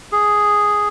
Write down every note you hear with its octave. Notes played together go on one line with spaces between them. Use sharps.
G#4